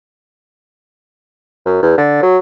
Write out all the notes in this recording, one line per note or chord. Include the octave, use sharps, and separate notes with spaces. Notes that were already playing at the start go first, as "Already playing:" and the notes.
F#2
E2
D3
F#3